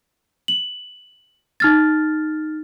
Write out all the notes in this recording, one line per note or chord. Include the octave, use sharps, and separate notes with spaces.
F#7
D#4 F6 A6